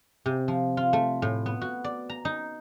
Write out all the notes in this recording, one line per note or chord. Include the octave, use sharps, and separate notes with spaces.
C3
F3
F4
A3
A2
B3
F#4
D5
A#5
D#4